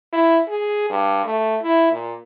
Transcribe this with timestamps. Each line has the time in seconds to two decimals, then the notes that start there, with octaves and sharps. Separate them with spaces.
0.13 E4
0.48 G#4
0.90 G2
1.25 A3
1.62 E4
1.92 A#2